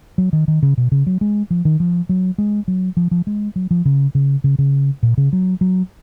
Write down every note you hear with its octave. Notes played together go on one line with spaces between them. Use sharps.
F#3
D#3
D#3
C#3
B2
C#3
F#3
G#3
F3
D#3
F3
F#3
G#3
F#3
F3
F3
G#3
F#3
F3
C#3
C#3
C#3
C#3
A#2
C#3
F#3
F#3